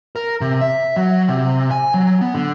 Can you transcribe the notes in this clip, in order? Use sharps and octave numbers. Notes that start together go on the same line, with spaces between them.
A#4
C3
E5
F#3
C3
G#5
F#3
B3
D3